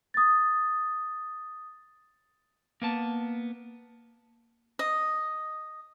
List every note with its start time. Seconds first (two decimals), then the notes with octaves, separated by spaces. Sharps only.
0.14 D#6 A6
2.82 A#3 B3 A5
4.79 D#5